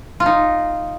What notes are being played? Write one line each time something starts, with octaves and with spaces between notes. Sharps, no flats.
F4
D#4